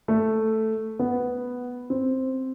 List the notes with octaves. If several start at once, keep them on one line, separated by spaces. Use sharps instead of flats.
A3
B3
C4